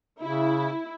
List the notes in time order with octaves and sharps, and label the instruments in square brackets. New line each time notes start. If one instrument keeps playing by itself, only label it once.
[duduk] C#3 [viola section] E4